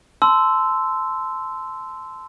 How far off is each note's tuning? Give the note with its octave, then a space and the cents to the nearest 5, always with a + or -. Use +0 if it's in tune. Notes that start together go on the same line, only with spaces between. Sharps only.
A5 -10 C6 -15 E6 +0